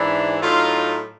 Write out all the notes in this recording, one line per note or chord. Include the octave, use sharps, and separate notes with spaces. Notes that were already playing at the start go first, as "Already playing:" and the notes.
Already playing: G#2 E3 D4 E4
A2 F#3 D#4 F4